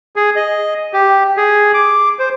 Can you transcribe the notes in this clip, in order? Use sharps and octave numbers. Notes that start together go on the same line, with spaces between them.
G#4
D#5
G4
G#4
D6
C5